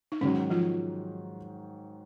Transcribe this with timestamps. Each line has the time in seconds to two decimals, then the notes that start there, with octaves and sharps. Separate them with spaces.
0.12 D#4
0.21 G#2 D#3 F#3 C#4
0.50 F3 F4